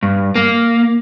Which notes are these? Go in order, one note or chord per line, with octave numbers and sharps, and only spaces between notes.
G2
A#3